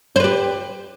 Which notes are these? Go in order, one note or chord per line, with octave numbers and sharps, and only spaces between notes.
G4 B4 C5